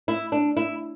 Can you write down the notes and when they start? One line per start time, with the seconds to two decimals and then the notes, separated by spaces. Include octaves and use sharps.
0.08 E4
0.32 D4
0.57 E4